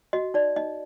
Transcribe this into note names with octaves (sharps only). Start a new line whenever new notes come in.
F#4 D#5
D#4 D5
D#4 D#5